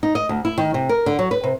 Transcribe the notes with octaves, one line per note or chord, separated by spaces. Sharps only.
D#4
D#5
D2
E4
D#3
C3
A#4
D3
F#3
B4
C3